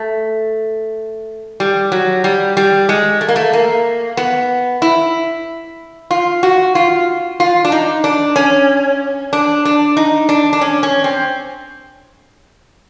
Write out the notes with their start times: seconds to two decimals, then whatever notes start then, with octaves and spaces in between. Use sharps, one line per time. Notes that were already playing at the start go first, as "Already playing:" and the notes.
Already playing: A3
1.60 G3
1.92 F#3
2.24 G3
2.57 G3
2.89 G#3
3.21 A3
3.28 A#3
3.36 A3
3.53 A#3
4.17 B3
4.82 E4
6.11 F4
6.43 F#4
6.75 F4
7.40 F4
7.65 D4
7.72 D#4
8.04 D4
8.36 C#4
9.33 D4
9.65 D4
9.97 D#4
10.29 D4
10.53 D4
10.61 C#4
10.83 C#4
11.04 C4